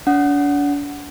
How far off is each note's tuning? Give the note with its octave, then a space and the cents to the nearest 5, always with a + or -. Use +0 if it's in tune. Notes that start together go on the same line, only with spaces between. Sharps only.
D4 -40 F#5 +0